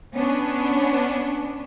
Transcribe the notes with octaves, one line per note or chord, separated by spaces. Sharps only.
B3 C#4 D4